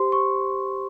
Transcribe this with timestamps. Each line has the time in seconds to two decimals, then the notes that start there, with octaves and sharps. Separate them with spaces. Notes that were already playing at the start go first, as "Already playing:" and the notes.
Already playing: G4 C5 C6
0.12 C#6